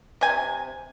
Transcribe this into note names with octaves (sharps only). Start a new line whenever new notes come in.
C3 G#5